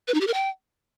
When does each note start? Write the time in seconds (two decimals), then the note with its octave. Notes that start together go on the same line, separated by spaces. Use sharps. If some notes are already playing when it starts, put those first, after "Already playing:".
0.08 B4
0.14 D#4
0.21 G4
0.27 A#4
0.34 G5